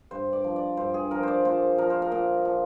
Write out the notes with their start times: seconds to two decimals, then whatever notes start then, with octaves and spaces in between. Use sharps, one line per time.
0.11 G2 C5
0.33 D5
0.44 F3
0.56 D5
0.77 G2 C5
0.94 G#4
1.11 F3 A#4
1.23 C5 D5
1.45 A#2 C5
1.78 F3 A#4
1.90 C5
2.02 A#4
2.12 A#2
2.45 F3